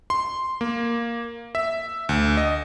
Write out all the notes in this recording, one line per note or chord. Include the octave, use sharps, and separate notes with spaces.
C6
A#3
E5
D2
D#5